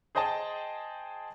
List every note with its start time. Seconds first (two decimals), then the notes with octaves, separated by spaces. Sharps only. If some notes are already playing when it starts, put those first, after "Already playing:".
0.15 G#4 C5 D#5 G5 A5